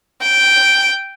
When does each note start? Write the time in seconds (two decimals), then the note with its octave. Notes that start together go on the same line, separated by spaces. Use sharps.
0.22 G5